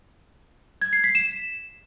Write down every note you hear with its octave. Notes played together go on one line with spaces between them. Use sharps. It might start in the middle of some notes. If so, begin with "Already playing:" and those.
G#6
C7
B6
E7